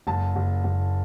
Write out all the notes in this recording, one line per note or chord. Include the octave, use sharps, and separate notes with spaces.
F#1 A5
F#1
F#1